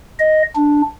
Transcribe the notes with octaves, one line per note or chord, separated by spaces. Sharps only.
D#5
D4